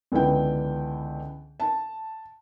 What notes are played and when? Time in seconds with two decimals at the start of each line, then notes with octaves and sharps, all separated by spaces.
0.12 C#2 D3 E3 B3 G5
1.60 A5